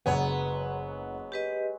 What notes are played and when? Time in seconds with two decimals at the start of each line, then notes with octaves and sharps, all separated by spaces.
0.06 F#1 F#3 G#3 B3 G#4 C#5 F#5
1.32 G4 B4 D#5